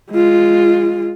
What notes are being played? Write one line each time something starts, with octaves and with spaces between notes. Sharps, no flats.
G#3 F4